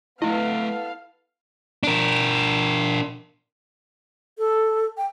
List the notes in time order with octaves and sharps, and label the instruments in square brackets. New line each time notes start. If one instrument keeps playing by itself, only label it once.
[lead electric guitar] A3 D#5 [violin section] B3 A4 [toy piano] E4 [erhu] F5
[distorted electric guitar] D4 A#4
[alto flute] A4
G5